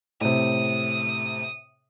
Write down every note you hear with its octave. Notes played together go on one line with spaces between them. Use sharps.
A2 C3 D#6